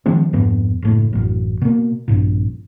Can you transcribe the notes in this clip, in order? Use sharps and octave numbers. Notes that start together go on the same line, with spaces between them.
D#3 F3 G#3 C4
F2 G#2 B3
F#1 A2
A1 F#2
B2 A#3
A#1 G2 A#2